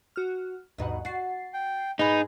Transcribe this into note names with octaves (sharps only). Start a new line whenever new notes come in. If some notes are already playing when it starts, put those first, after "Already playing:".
F#4 F6
D2 G2 B2 D#4 F#5
F#4 A6 C7
G5
G#2 B3 D#4 G#4 B4